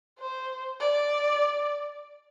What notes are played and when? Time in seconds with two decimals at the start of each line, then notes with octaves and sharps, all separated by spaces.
0.19 C5
0.80 D5